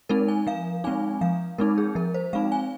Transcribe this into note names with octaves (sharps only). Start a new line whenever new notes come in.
G#3 C4 D#4 A#4
G#5
F3 F5
G#3 C4 D#4 G#5
F3 F5
G#3 C4 D#4 A#4
G#4
F3 A#4
C5
G#3 C4 D#4 F5
G#5